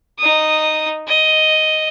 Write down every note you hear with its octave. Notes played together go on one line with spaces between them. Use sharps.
D#4 D#6
D#5